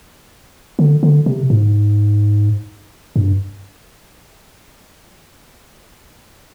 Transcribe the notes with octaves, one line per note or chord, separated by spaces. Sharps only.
D3
D3
C3
G#2
G2